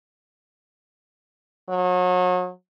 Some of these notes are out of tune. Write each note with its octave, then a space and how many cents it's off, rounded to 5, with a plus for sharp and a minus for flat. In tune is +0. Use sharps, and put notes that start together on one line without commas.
F#3 -35